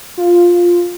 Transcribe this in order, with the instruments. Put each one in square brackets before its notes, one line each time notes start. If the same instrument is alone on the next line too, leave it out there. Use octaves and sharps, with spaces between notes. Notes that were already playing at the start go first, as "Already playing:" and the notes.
[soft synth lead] F4